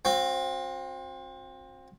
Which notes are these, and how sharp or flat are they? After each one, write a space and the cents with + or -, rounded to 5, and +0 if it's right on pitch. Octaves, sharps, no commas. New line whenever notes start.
C4 +20 F#4 -40